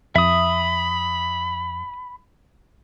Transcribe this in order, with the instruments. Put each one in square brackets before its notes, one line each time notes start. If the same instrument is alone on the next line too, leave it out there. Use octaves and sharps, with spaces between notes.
[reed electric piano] F2 [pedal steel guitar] E5 D#6 [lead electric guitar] B5